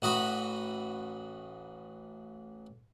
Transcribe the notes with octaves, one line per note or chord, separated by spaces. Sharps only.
A1 F#4 D#5 B5